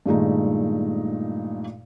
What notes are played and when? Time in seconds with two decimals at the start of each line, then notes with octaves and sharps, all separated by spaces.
0.06 G2 A#2 D#3 G#3 A3 D#4